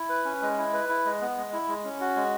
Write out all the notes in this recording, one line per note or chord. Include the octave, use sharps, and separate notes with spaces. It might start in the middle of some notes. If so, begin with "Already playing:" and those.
Already playing: E4
B4
C#4
G#3
E4
B4
E4
G#3
B3
G#3
E4
G#3
C#4
F#4
G#3